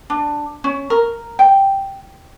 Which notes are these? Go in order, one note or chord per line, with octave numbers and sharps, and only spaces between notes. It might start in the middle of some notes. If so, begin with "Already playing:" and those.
D4
C#4
A#4
G5